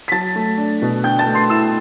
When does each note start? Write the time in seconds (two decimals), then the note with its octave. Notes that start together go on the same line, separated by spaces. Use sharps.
0.08 B6
0.12 F#3 A5 A6
0.36 A3
0.58 D4
0.82 B2
1.04 D3 G5 G6
1.19 A5 A6
1.27 A3
1.34 C6 C7
1.50 E4 E6 E7